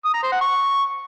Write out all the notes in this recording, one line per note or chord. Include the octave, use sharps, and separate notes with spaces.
D#6
A#5
C5
F#5
C#6